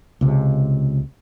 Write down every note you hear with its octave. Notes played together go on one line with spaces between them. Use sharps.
C#2 C3